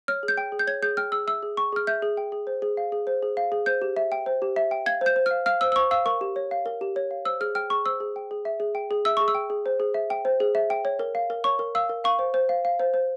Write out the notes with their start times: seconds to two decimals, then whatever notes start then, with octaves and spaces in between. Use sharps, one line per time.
0.08 C#5 F6
0.23 G#4
0.28 G6
0.37 G5
0.52 G#4
0.59 G6
0.67 C#5 G#6
0.82 G#4 G6
0.97 G5 F6
1.12 G#4 E6
1.27 E5 E6
1.43 G#4
1.57 G5 C#6
1.72 G#4 F6
1.87 E5 G6
2.02 G#4
2.17 G5
2.32 G#4
2.47 C5
2.62 G#4
2.77 F5
2.92 G#4
3.07 C5
3.22 G#4
3.37 F5
3.52 G#4
3.66 C5 G6
3.82 G4
3.96 E5
4.12 G5
4.26 C5
4.42 G4
4.56 E5
4.71 G5
4.86 F5 G#6
5.01 C5 G6
5.16 C5
5.26 F5 F6
5.46 F5 F6
5.61 C5 E6
5.72 E6
5.76 C5 C#6
5.91 F5 E6
6.06 A#4 C#6
6.21 G4
6.36 C#5
6.51 F5
6.66 A#4
6.81 G4
6.96 C#5
7.11 F5
7.25 C5 E6
7.41 G#4 F6
7.55 G5 F6
7.70 G#4 C#6
7.86 C5 E6
8.00 G#4
8.16 G5
8.31 G#4
8.45 E5
8.60 G#4
8.75 G5
8.91 G#4
9.05 E5 E6
9.17 G#4 C#6
9.28 E6
9.35 G5
9.50 G#4
9.66 C5
9.80 G#4
9.94 E5
10.10 G5
10.25 C5
10.40 G#4
10.55 E5
10.70 G5
10.85 C#5
10.99 A#4
11.15 F5
11.30 A#4
11.44 C#5 C#6
11.59 A#4
11.75 F5 E6
11.89 A#4
12.04 F5 C#6
12.19 C5
12.34 C5
12.49 F5
12.65 F5
12.79 C5
12.94 C5